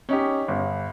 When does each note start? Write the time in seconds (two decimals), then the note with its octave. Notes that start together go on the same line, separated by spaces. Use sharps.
0.09 C#4 D#4 G4
0.48 G1